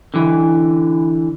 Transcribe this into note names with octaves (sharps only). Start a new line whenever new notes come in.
D3 E3